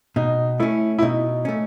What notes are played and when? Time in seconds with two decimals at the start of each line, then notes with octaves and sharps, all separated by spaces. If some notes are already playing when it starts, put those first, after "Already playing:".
0.16 B2 D#4
0.60 A3 C#4 E4
0.98 E4
1.02 B2 D#4
1.45 A3 C#4